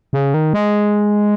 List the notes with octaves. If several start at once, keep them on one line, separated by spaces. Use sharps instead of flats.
C#3
D#3
G#3